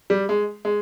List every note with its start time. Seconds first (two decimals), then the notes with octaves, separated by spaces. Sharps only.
0.10 G3
0.29 G#3
0.65 G#3